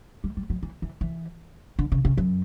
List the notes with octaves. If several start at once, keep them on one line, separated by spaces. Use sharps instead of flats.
G3
G3
F#3
E3
E3
E3
D3
C#3
C#3
F#2